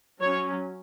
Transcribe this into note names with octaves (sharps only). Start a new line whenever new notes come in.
F#3 C#4 C#5